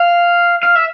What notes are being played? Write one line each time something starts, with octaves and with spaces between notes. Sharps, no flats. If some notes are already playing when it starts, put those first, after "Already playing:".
Already playing: F5
F5
E5